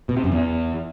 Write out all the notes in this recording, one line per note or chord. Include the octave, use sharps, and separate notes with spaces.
B2
C3
F#2
E2